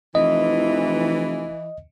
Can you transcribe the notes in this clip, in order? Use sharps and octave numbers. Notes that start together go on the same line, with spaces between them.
F1 E3 D#5